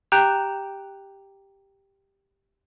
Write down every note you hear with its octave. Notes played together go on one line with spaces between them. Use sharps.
G4 G5 A#5 F#6 G6